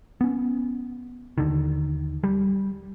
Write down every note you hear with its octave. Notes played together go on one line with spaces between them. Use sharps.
B3 C#4
D#2 D3 D#3
G3